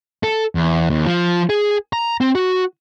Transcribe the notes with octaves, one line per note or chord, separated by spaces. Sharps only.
A4
E2
D#2
F3
G#4
A#5
C4
F#4